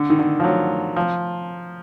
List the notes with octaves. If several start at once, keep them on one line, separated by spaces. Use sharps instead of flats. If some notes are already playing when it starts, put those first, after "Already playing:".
Already playing: D3
D#3
D3
F3
F#3
F3